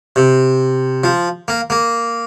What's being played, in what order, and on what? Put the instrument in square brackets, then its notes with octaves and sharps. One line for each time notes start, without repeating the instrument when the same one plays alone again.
[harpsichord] C3
F3
A#3
A#3